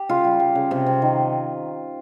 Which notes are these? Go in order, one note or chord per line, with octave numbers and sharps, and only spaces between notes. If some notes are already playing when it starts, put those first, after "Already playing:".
Already playing: G4
C#3 F4
G3
G3
C#3
C3
C3
D#3